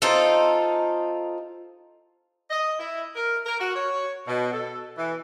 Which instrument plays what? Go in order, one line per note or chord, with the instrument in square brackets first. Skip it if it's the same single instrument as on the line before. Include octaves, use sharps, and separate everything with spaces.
[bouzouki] C4 D#4 F4 A4
[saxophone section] D#5
E4
A#4
A#4
F#4
C#5
B2
A4
E3